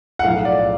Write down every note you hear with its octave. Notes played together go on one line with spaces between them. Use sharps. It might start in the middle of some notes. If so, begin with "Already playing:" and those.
F#5
B1 A2 F3 F5
D5